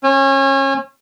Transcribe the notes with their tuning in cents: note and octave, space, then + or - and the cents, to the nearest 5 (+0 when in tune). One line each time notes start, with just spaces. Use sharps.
C#4 -30